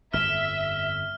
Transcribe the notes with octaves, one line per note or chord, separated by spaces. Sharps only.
G1 F2 E5 F6